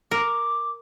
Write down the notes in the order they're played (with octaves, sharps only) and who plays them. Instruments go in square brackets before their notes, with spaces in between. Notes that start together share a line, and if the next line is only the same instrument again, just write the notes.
[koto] A#4 [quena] D6